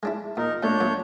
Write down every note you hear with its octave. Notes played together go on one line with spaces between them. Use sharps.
G#3 D4 E4
A#2 D#4 A#4
A#2 A3 D4 C#5 G6
A#2 F#3